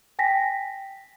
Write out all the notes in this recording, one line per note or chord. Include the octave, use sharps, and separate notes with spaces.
G5 G#5 A#6 B6